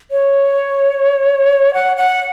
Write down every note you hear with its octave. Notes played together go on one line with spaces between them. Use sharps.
C#5
F#5
F#5